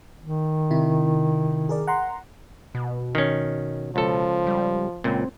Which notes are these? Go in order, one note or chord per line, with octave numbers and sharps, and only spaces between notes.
D#3
C3 E4
G#4 A#4 D5
F#5 A#5 C6
B2
D#3 C#4
C#2 F3 A4
G3
C#2 A#2 C4